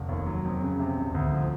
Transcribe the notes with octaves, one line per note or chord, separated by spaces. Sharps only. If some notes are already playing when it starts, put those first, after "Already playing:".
Already playing: F1
D#2
F#3
F2
C#3
C3
E1
D2
F3